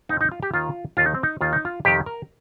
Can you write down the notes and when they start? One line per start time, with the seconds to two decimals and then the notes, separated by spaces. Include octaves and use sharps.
0.09 F2 D#4
0.12 F3
0.21 D#4
0.32 F4
0.43 G4
0.53 D#2 D#3 F4
0.97 D#2 D#3 F4
1.06 D#4
1.15 C4
1.23 D#4
1.41 D#2 D#3 F4
1.53 D#4
1.65 F4
1.85 F2 C3 D#3 G4
2.06 A#4